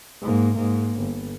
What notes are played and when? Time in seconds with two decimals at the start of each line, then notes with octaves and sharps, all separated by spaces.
0.22 G#2 A#3
0.55 G#2 A#3
0.99 G1